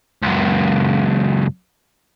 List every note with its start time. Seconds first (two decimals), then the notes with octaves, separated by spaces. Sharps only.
0.23 C#2 F#2